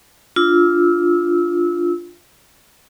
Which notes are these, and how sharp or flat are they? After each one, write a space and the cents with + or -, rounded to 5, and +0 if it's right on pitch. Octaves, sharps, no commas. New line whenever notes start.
D4 +5 F4 +0 E6 -25